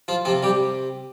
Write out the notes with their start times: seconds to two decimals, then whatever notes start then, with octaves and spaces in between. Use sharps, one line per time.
0.08 F3 F4
0.25 C3 F3 F4
0.43 G3 G4